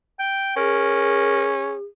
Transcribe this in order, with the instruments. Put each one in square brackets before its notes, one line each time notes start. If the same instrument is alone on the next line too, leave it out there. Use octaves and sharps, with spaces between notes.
[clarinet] G5
[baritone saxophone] C#4 [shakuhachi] G#4 [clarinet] A#4